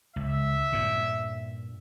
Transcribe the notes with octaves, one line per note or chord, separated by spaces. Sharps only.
C#2 E5
G2 A#2